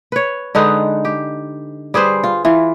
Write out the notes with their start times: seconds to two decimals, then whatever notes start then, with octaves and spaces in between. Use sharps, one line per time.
0.12 B4 C#5
0.55 D3 G#3 D#4 B4
1.05 G4
1.94 G3 G#4 B4 C5
2.24 F4
2.45 E3 F4